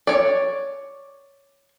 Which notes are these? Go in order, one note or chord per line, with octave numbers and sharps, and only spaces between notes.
C#5 D5